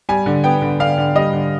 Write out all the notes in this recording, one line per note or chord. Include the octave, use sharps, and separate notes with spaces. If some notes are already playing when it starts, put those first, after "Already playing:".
G3 G#5
D3
B3 G5
D3
D3 F5
D3
G3 D#5
D3